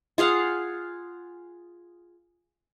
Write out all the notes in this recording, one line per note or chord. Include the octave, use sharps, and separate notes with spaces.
F4 G#4 F5 F#5